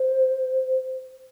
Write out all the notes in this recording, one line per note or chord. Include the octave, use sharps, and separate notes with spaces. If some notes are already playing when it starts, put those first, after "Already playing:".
Already playing: C5